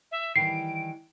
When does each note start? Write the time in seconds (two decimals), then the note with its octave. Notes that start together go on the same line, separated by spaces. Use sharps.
0.12 E5
0.36 D#3 E3 G3 C7 D7